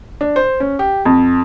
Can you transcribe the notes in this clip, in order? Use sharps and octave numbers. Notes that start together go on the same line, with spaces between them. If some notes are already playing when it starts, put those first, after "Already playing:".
D4
C5
C#4
G4
F2